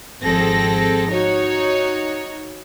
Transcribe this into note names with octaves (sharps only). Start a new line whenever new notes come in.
G#1 F3 C4 G#4 A4 A#6
D#4 F#4 C#5